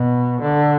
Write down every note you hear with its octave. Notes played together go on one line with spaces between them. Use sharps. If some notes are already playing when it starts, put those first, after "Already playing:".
Already playing: B2
D3